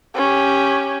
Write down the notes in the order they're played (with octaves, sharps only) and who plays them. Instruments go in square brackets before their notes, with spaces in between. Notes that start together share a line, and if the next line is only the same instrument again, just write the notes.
[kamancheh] C#4 G4